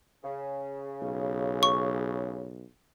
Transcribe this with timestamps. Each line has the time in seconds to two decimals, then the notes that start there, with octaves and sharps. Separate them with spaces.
0.23 C#3
1.02 B1
1.63 C#6